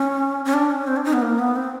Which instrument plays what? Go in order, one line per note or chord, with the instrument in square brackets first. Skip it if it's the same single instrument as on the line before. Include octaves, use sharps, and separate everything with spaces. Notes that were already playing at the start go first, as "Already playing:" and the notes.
Already playing: [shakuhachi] C#4
C#4
D4
C#4
C4
D4
D#4
B3
A#3
B3
C4